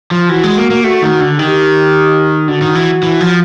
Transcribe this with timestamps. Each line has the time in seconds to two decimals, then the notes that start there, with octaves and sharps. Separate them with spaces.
0.11 F3
0.29 E3 F#4
0.43 G#3
0.57 A#3
0.71 A#3
0.84 A3 F#4
1.02 D#3
1.21 D3
1.38 D#3 G4
2.48 D3 F#4
2.61 D#3
2.75 E3
3.03 E3
3.21 F3